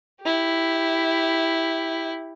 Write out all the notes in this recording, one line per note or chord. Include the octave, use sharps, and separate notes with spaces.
E4 G4